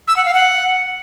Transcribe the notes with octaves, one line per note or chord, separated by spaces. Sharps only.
E6
F#5
F5
F#5